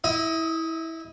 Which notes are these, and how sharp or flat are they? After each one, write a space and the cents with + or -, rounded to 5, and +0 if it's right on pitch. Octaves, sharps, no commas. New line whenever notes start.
E4 -20 D#5 +15